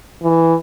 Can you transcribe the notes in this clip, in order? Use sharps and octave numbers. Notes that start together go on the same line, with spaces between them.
E3